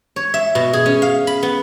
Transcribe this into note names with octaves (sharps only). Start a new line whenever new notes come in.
C#5
E5
B2
G#4
C#4
F5
B5
B3